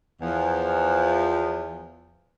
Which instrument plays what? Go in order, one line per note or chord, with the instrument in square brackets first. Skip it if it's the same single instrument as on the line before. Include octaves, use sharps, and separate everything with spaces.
[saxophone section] E2 F3